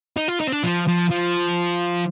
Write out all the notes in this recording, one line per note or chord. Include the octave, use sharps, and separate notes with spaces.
D#4
F4
D#4
C4
D4
F3
F3
F3